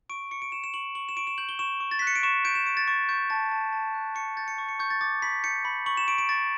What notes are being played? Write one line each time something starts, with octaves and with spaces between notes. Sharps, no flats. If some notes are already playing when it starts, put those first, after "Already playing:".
C#6 D7
C#6 C#7
D7
C#6 E7
E7
C#6 F#7
C#6 F#7
E7
C#6 D7
E7
G6 F#7
G7
C#6 E7
C#6
A6
F#6 B6
C#7
D7
C#6 E7
G6 D7
E7
C#6 D7
A6
C#6 A6
C#6 G6
A5 A6
A5
A5
F#6
C#6 C#7
G6 A6
C#7
C#6
C#7
C#6 G6
A6
D6 A6
B5 B6
G6 C#7
B5
C#6 F#7
E7
C#6 D7
D7
C#6 A6